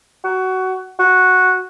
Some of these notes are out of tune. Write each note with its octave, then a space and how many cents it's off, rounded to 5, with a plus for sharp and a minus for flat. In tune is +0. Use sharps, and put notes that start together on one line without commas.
F#4 +15
F#4 -5